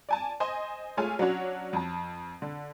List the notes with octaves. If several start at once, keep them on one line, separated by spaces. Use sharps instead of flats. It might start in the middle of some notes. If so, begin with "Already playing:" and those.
D5 G#5 A5
C5 D#5 G#5
G#3 A3 F4 C#5 G#5
F#3 C#4 D4 F#4 C#5
F2 A5
D3